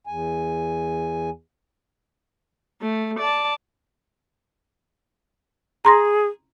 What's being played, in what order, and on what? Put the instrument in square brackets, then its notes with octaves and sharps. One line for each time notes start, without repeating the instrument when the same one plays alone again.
[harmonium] E2 G#5
[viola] A3
D5 A5
[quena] G#4 [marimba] A#5 C6 A#6